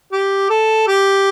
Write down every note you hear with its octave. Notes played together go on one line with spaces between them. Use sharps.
G4
A4
G4